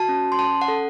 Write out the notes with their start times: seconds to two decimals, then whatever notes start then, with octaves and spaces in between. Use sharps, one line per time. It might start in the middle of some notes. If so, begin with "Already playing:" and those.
Already playing: F#4 A5
0.09 C#4
0.32 C6
0.39 C#4 A5
0.61 F#5
0.68 A4